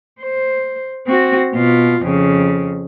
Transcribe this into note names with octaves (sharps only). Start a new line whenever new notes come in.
C5
C4 F#4
B2 F4
F2 C#3